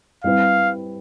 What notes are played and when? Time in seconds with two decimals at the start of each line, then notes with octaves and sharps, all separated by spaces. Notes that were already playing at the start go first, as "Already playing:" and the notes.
0.24 G3 C4 E4 G4 B4 F5